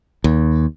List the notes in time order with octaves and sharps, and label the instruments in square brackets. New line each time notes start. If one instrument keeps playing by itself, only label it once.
[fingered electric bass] D#2